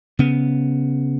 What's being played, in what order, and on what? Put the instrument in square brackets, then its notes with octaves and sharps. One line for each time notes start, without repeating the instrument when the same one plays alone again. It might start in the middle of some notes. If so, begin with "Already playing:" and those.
[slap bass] C#3 B3